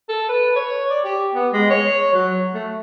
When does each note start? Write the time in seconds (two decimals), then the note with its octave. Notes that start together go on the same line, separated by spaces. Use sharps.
0.09 A4
0.29 B4
0.56 C#5
0.90 D5
1.04 G4
1.35 B3
1.53 G#3
1.70 C#5
2.14 F#3
2.55 A3